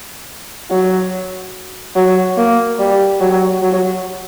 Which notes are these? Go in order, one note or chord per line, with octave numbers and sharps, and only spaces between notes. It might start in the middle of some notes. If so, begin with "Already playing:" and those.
F#3
F#3
A#3
G3
F#3
F#3